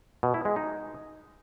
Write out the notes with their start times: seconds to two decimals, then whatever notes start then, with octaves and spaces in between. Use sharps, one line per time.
0.23 B2
0.34 E4
0.45 G#3
0.56 D#4